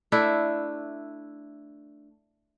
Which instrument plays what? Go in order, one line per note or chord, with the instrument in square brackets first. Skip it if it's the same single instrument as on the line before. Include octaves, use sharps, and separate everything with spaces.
[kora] A3 D4 E4